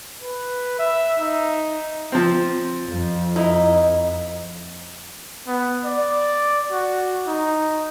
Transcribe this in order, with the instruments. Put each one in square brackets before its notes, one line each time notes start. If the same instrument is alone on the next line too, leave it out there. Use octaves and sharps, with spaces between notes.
[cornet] B4
E5
D#4
[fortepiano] F3 C4
[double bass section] F2
[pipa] D#4 [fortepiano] E4
[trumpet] B3
D5
F#4
D#4